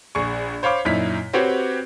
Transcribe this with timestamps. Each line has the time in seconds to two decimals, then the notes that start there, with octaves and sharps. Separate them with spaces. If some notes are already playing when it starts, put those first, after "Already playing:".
0.15 A#1 G#4 C#6
0.63 C5 C#5 F5 B5 D6
0.85 F#2 A#2 D#4 E4 B6
1.33 C4 F#4 G4 B4 C#5